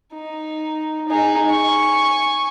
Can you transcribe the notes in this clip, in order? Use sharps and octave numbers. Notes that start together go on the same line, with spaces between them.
D#4
D#4 G#4
G#5 C#6